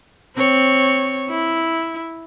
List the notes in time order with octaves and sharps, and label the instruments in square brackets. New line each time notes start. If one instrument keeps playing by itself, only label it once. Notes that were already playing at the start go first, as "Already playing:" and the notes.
[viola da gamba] C4 C#5
E4